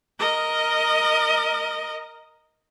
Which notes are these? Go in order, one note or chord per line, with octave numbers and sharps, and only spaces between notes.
A#4 D#5